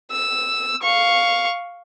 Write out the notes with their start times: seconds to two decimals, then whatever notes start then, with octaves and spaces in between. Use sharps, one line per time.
0.11 E6
0.82 F5 C#6